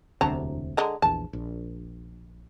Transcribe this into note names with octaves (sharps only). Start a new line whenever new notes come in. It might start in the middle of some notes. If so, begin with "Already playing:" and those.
E1 D2 C3 F#3 A5 A#5
D3 G#3 A#5
A#1 E2 A5
A#1